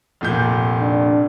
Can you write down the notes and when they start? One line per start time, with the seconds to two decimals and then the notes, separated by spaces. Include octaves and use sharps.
0.21 F1 A#2 G6
0.80 D4